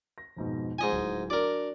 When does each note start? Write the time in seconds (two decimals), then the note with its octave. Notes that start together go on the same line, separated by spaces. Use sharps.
0.18 A#6
0.37 F2 G#2 B2
0.78 G#2 F3 D#4 D#5 G#5
0.92 D1
1.30 D4 F#4 A#4 D5